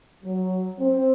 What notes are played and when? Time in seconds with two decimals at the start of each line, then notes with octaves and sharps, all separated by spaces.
0.24 F#3
0.80 C4